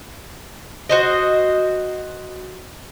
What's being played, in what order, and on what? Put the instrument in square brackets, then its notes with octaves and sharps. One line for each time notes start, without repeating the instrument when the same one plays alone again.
[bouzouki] F#4 C5 D#5